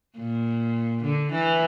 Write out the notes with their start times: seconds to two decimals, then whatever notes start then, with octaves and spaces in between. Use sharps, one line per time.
0.18 A#2
1.03 D3
1.32 E3